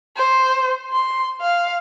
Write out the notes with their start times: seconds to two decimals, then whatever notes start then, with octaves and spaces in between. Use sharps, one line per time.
0.17 C5
0.92 C6
1.41 F5